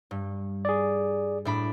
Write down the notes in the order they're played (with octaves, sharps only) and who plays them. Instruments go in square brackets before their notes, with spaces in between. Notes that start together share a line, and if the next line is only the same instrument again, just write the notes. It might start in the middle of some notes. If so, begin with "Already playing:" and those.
[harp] G2
[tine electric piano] G#4 D5
[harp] A2 D4 B5